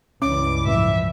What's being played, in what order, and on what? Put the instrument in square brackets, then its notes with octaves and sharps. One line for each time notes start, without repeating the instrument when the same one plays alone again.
[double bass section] C#2 G2 E3 [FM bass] C#4 [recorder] D6
[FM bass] A2 [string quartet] F3 E5